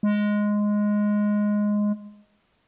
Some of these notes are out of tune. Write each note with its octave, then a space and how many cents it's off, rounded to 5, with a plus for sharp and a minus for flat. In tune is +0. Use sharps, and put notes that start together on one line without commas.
G#3 +0